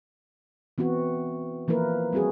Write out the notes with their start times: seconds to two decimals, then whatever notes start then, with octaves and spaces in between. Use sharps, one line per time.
0.78 E3 B3 C4 F#4
1.68 E3 F3 A#3 E4 A#4 B4
2.13 G3 C4 F#4 G#4